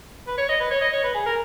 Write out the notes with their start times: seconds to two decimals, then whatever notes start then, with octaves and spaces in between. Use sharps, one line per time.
0.27 B4
0.38 C#5
0.49 D#5
0.60 B4
0.71 C#5
0.81 D#5
0.93 C#5
1.04 B4
1.14 G#4
1.26 A#4